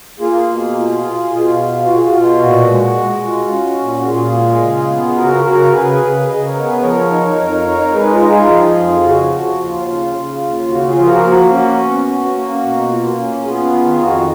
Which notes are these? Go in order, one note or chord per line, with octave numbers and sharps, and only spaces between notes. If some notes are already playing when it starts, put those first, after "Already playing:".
A#3 F4 G#4
B2
F4
F4
B2 F4
F4
F4 F#4
G#4
F#4
B2 F4
A#2 F#4
G#3
G#3
F4
C#4
A#2
F#4
A#2 F4 G#4
G#3
C#3
B3
C#3 F#4 A#4
C#3 F#4 A#4
C#3 G#4 B4
C#3
C#3 B4 D#5
A#4 C#5
B3
G#4 B4
F3 A#4 C#5
D#4
F2 A#4 C#5
D#4
C#5
G#3 G#4 B4
F4 G#4
D#4
F4 G#4
F3
F2
C#3 F#4
F3
D#2 F4
C#3
C#3
D#2
C#3 F#4
F4 G#4
F3
F#4 A#4
A#3 F#4
C#4 F#4
B2
C#4
A#3
B2
A#3 F4
C#4
B3 F4 G#4
D#3
F2 F#4